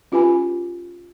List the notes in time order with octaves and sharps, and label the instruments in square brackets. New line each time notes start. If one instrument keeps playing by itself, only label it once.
[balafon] C#4 F4 G4 B4 G#5 B5